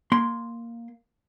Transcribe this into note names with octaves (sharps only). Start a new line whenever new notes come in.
A#3 C6